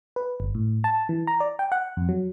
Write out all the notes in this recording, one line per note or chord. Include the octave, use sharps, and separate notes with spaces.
B4
G1
A2
A5
E3
A#5
D5
G5
F#5
F2
F#3